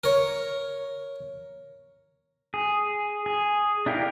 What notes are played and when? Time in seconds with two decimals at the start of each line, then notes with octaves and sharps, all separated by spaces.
0.04 A#4 C#5
2.54 G#4
3.26 G#4
3.86 D4 E4 G4 A#4 F5